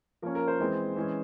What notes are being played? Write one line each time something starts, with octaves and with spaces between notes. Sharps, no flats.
F3 A#3 C#4 A#4
A#4
C5
E3 G#3 C4
E3 G#3 C#4